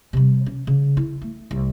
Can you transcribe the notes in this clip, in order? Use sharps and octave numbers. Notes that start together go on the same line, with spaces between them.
C3 G3
C#4
C#3
E4
A3
C2